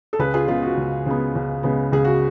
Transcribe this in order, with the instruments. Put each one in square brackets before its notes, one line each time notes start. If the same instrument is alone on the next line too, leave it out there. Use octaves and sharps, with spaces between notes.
[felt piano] A4
C#2 G#4 B4
F4 G#4
C#3 G#3 B3 F4
F#4
C#2
C#3 G#3 B3
C#2
C#3 G#3 B3
C#2 G#4
F#4